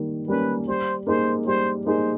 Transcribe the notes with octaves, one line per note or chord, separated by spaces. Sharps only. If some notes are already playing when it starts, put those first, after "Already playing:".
Already playing: D#3 G3 A#3
G3 A#3 C#4 B4
G3 C5
A#3 D#4 G#4 C5
G3 C5
A#3 D#4 G#4 C5